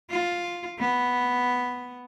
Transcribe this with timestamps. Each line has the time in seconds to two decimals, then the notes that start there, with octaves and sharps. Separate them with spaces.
0.10 F4
0.79 B3